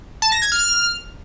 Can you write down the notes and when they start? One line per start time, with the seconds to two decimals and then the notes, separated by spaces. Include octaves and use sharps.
0.22 A5
0.32 A#6
0.42 G#6
0.52 F6